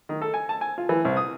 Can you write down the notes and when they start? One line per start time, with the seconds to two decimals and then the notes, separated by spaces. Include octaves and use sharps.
0.09 D#3
0.22 A4
0.34 G#5
0.49 A5
0.61 G#5
0.78 F4
0.89 E3
1.05 C2
1.17 D#6